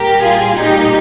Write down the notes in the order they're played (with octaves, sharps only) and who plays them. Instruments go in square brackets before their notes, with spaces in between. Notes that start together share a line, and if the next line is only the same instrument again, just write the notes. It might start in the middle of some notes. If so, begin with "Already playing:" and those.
Already playing: [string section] A#2 G3 G4 A#4
F4 G#4
D#4 G4